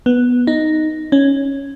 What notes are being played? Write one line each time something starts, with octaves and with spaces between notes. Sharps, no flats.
B3
D#4
C#4